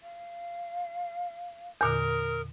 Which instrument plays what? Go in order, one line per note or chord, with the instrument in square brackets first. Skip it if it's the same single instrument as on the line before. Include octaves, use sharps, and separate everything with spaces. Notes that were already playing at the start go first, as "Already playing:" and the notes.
[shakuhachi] F5
[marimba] E2 A#2 D3 [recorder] A#4 [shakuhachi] D#6